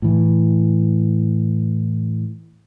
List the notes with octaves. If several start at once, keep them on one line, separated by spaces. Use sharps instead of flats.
A2 E3